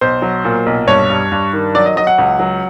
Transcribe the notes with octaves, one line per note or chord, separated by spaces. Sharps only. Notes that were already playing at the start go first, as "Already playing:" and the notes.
B1 C5
F#3
A#2
B1
G2 C#5
G2
G2
D#3
F#3 D5
D#5
F#3 D#5
F#5
C#2
F#3